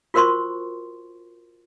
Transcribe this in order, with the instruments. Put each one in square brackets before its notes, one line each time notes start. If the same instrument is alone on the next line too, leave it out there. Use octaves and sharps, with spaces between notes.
[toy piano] F4 F#4 A#4 C5 C6 C#6